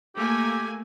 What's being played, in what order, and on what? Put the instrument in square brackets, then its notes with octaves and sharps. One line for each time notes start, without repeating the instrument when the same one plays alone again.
[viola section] A3 A#3 G#5 [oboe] G4